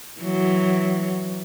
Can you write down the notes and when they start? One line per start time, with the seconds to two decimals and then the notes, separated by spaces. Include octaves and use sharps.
0.21 E3 F#3